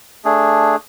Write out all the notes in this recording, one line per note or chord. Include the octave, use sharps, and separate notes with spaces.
A3 D4 G#4